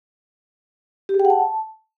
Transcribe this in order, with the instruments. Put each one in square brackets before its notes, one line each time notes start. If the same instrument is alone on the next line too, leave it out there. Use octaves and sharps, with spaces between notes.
[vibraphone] G4
G#4
G5
F#5
A5